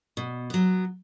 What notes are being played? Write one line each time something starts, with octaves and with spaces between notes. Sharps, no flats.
B2
F#3 B3